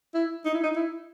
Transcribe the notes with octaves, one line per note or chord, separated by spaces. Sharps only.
E4
D#4
E4
D#4
E4